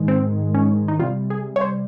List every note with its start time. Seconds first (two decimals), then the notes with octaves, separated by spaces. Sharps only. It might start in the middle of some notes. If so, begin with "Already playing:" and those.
Already playing: G#2 D#3 G#3
0.08 C4
0.54 C#4
0.88 D#4
1.00 C3 G3 F4
1.30 G#4
1.56 C#5
1.61 C5